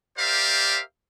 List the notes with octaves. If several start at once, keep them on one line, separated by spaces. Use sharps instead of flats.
G4 A#4 C5 D5 E5 F5